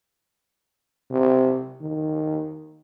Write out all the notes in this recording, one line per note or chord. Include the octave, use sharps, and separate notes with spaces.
C3
D#3